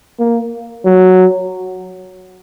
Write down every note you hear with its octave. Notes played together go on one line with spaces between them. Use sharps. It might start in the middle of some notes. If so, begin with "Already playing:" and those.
A#3
F#3